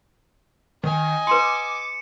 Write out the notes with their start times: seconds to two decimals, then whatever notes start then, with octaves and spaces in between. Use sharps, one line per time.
0.84 D#3 D#5 G#5
1.27 B4 C6 D6 C#7 D#7 E7